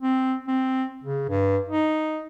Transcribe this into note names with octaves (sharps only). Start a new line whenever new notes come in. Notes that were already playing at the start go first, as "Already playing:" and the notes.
C4
C4
C#3
G2
D#4